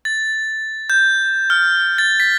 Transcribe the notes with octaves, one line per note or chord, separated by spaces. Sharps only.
A6
G6
F6
A6
B6